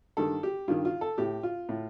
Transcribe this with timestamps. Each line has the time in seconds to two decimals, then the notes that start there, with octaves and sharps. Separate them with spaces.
0.17 G2 D#3 A4
0.43 G4
0.68 G2 D#3 F4
0.85 F4
1.01 A4
1.18 A2 G4
1.43 F4
1.69 A2